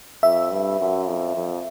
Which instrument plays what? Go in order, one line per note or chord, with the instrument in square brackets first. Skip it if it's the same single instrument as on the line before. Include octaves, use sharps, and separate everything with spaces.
[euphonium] F2 [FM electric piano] E5
[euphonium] G2
F#2
F2
F2